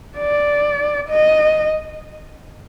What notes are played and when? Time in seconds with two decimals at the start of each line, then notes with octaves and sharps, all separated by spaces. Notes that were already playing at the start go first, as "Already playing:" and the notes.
0.18 D5
1.09 D#5